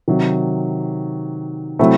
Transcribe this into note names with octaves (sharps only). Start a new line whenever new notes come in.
C3 D#3 F#3
C3 F#3 A3 C4 E4